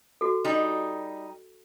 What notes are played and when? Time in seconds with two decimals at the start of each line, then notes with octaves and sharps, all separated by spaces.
0.21 F#4 A4
0.44 G3 D#4